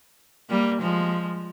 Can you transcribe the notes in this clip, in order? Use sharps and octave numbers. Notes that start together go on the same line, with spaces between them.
G3 A#3
F3 G#3